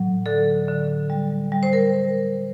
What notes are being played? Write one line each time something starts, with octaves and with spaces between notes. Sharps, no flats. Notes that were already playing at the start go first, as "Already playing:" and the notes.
Already playing: A2 F#3
D3 A4
D3
G3
G3
C5
A#4